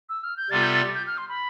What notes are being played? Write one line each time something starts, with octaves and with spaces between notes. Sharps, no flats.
E6
F6
G6
C3 G3 B3 F4 A4 A6
G6
A6
G6
F6
C6
B5